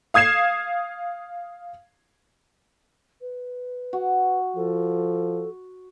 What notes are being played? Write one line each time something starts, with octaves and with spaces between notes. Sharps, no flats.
F5 D#6 G#6 C7 E7
B4
F#4
F3 A4